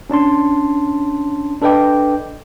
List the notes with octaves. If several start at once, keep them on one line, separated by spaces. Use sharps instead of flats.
C#4 D4 A5 C6
D4 A4 B4 D#5 G5 D6